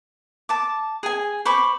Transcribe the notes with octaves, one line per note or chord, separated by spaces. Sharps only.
A5 D6
G#4 G#5
C5 B5 C#6 D6